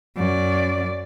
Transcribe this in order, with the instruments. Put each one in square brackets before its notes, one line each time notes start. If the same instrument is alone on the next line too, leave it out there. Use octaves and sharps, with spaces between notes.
[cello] F#2 D5